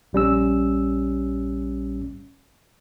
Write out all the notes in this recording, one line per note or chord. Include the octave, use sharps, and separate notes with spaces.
A#1 G3 C#4 E6